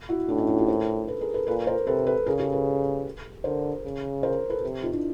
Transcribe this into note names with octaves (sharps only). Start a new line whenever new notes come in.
E4 F#4
A2 D4 E4
C#4 D#4
E4 F#4
F4 G4
A#4 C5
A4 B4
G#4 A#4
A4 B4
A#2 A4 B4
A#4 C5
C3 A4 B4
A4 B4
C#3 G#4 A#4
G4 A4
A4 B4
D3 A#4 C5
C#3
A#4 C5
A4 B4
C3
D#4 F4
D4 E4